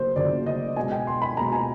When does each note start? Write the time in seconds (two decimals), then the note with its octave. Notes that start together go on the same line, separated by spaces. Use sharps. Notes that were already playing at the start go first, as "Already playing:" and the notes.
Already playing: C#3 F#3 A#3 C5
0.15 C#3 F#3 A#3 D5
0.46 D#5
0.76 B2 G#3 G#5
0.92 G5
1.07 C6
1.22 B5
1.37 B2 G#3 A#5
1.52 G#5